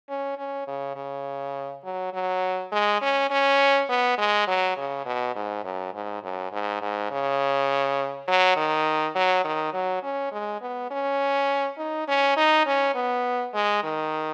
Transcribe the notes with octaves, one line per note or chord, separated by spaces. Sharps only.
C#4
C#4
C#3
C#3
F#3
F#3
G#3
C#4
C#4
B3
G#3
F#3
C#3
B2
G#2
F#2
G#2
F#2
G#2
G#2
C#3
F#3
D#3
F#3
D#3
F#3
C#4
G#3
B3
C#4
D#4
C#4
D#4
C#4
B3
G#3
D#3